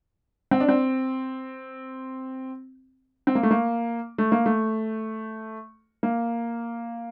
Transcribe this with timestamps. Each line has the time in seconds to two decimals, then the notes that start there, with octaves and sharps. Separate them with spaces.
0.51 C4
0.60 D4
0.69 C4
3.27 C4
3.35 A#3
3.43 A3
3.51 A#3
4.18 A3
4.32 A#3
4.46 A3
6.03 A#3